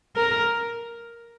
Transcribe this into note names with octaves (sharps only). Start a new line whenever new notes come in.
A#4